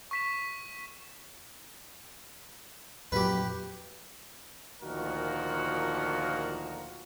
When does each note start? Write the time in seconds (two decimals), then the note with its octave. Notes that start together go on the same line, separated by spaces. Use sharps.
0.11 C#6 B6 E7
3.12 F2 A#2 F#3 G4 B4
4.82 D2 A#2 D#3 F3 F#4 A#4